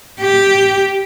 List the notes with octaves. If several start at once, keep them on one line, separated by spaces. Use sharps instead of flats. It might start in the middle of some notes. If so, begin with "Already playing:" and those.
G4